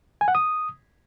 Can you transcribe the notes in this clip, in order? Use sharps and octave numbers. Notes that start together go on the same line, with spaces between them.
G#5
F#5
D#6